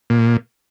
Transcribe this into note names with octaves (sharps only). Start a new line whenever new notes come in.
A#2